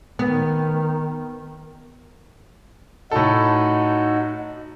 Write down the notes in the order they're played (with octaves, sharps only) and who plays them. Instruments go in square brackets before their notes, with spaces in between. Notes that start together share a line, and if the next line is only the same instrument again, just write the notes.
[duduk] D#3 [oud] B3
[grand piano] A2 A4 [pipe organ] D#4 F#4